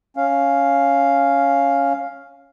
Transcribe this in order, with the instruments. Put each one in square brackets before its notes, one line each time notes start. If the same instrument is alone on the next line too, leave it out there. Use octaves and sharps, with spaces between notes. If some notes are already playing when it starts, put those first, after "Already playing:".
[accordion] C#4 F5